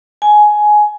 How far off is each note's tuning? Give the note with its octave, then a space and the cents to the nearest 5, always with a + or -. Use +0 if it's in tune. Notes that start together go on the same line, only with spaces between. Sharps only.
G#5 +15